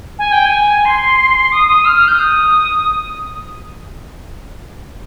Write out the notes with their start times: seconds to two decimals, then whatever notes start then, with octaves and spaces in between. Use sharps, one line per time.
0.19 G#5
0.32 G5
0.45 G#5
0.85 C6
1.52 D#6
1.68 D#6
1.85 F6
1.96 F6
2.08 G6
2.18 D#6